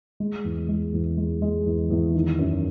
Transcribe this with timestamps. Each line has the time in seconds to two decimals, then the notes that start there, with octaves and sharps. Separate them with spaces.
0.20 G#3
0.44 E2
0.69 G#3
0.93 E2
1.17 G#3
1.42 G#3
1.66 E2
1.90 E2
2.15 D#3
2.39 F#2